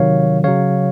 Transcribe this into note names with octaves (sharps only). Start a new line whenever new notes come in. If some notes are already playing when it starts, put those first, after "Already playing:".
Already playing: C3 D#3 F#3 C#5 F5
C#3 F#3 C#5 F5